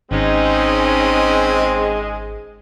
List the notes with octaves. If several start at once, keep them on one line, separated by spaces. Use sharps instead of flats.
G#1 G#3 C4 C#4 D#4